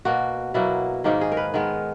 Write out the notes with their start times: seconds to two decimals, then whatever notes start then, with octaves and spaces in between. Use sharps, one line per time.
0.05 B2 A#3 F#4
0.54 B2 F#3 A#3 E4
1.04 G#2 D#3 A#3 D#4
1.21 G#4
1.32 A#4
1.37 B4
1.54 D#3 G#3 B3 A#4